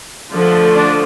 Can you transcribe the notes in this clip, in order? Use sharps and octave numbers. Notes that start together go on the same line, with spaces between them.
D3 F3 A3
D4